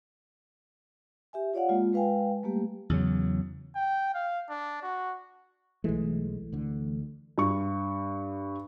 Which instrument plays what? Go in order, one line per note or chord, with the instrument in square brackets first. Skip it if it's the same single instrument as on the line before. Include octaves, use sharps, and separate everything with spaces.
[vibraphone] G4 E5 G#5
F4 C#5 D5 F5 F#5
G#3 A#3 F4
G#3 B4 F5 G5 G#5
G3 A3 A#3 G4
[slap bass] E2 C#3 F#3
[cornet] G5
F5
D4
F#4
[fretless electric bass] B1 G#3 [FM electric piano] E3 A3
[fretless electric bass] D2 D3
[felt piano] G2 C#6